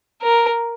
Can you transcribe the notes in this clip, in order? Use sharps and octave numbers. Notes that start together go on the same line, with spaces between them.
A#4